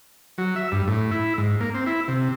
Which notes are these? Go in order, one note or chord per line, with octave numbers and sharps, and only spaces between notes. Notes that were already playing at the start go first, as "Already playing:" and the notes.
F#3
E5
G2
A2
E4
G#2
A#3
C4
E4
C3